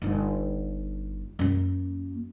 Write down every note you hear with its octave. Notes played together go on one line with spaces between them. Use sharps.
G1 D#4
F#2 A#3